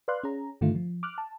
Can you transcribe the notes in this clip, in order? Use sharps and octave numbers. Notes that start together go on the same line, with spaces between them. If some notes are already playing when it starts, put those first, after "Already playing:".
B4 D5 F5 C6 F#6
C#4 G#4 A#5
G2 D3 D#3 A3 F4
F3
D6 F6 F#6
A5